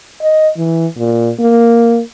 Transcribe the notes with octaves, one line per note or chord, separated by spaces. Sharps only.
D#5
E3
A#2
A#3